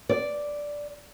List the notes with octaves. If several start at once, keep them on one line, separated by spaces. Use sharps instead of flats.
D5